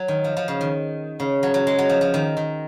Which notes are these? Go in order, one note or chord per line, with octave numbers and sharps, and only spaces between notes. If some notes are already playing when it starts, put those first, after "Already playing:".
Already playing: F#3
D#3
F3
F3
C#3
D#3
C#3
F#3
F#3
G#3
F#3
F3
F3
D#3
D#3